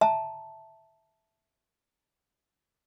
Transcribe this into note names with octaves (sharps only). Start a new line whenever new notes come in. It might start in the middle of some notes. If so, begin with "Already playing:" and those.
E5 A5 A#5